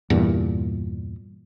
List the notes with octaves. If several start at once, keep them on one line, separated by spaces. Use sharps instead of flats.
E2 G2 A#2